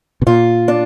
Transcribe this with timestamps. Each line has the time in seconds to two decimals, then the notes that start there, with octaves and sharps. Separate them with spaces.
0.22 B2
0.27 A#2 F4
0.68 D4